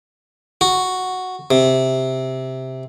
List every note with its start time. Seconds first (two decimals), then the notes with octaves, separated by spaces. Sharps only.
0.61 F#4
1.51 C3